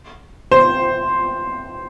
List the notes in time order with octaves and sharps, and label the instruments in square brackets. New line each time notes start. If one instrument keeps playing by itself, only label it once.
[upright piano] C5